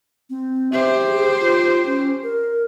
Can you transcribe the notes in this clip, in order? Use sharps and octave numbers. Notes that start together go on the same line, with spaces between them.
C4
G4 C5 E5
G#4
F4
C#4
A#4